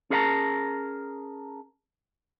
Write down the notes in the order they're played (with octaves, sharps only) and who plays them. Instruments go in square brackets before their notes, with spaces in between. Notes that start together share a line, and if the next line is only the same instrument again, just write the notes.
[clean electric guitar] C#4 G#4 A#4 E5 A5 A#5